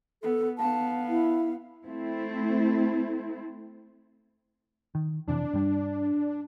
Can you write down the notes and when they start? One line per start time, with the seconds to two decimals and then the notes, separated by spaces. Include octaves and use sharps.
0.23 B3 A4
0.58 B3 F5 A5
1.09 E4
1.85 A3 C4 E4
4.95 D#3
5.28 F2 C3 E3 D4
5.54 G2 G3